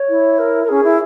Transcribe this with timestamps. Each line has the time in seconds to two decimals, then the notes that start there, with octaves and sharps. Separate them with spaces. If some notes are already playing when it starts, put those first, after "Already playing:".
Already playing: C#5
0.09 E4
0.39 A#4
0.64 A#4
0.69 C#4 G#4
0.83 E4